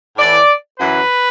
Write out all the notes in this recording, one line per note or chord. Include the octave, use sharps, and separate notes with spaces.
A2 E3 D5
F#2 E3 B4